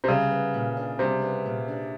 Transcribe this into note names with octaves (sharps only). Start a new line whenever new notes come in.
C3
C#3 G3
B3
A#2
D4
C3 G3
B3
A#2
D4